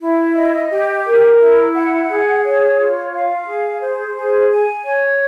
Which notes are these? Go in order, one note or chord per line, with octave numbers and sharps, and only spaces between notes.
E4
D#5
G4
A#4
E4
F#5
G#4
C#5
F4
F5
G#4
C5
G#4
G#5
C#5